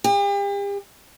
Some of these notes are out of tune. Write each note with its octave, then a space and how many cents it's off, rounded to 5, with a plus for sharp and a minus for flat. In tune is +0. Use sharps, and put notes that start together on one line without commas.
G4 +40